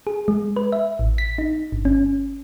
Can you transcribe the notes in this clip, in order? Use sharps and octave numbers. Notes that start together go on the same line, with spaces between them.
G#4
G#3
B4
E5
A1
B6
D#4
G1
C#4